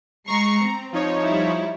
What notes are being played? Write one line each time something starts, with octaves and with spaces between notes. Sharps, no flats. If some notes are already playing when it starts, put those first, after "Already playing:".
G#3 A#5 C#6 C7
C4
F3 D#4 C#5
G3 E4